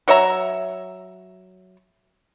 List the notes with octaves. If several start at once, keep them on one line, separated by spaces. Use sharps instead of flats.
F#3 C#5 E5 A#5